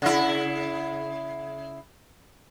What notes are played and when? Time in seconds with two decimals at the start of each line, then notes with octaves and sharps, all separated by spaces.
0.02 C#3 E4